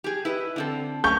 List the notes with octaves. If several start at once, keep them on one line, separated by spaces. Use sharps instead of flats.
G4 G#4
E4 B4 D#5
D3 C4 A4
A3 C#4 C#6 G6